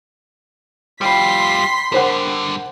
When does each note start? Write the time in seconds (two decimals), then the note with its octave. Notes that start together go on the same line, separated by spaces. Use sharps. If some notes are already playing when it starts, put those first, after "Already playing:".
1.01 G3 F4 G5 B5 C6 B6
1.92 G2 D3 A#4 C5 F#5